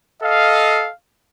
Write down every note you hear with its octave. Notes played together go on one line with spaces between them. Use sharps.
A4 D#5 F5